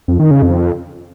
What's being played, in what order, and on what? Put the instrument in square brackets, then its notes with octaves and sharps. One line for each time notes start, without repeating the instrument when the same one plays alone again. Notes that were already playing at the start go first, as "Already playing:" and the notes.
[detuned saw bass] F2
D#3
C#3
F2